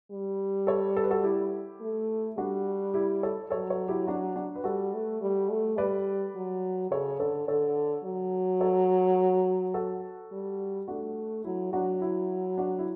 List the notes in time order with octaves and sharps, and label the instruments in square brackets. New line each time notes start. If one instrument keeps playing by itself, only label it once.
[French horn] G3
[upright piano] A4 C#5
A4
B4
F#4 A4
E4 G4
[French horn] A3
[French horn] G3 [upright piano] D4 F#4
[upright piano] E4 G4
A4 C#5
[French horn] F#3 [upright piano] A4 C#5
[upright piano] A4 C#5
E4 G4
D4 F#4
D4 F#4
B4
[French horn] G3 [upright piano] F#4 A4
[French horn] A3
G3
A3
[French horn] G3 [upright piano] B4 D5
[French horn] F#3
[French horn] C#3 [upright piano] A4 C#5
[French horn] D3 [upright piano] A4 C#5
[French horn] D3 [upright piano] A4 C#5
[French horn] F#3
[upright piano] A4 C#5
F#4 A4
[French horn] G3
[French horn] A3 [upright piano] D4 F#4
[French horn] F#3 [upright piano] E4
[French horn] F#3 [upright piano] D4 F#4
[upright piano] E4
D4 F#4
E4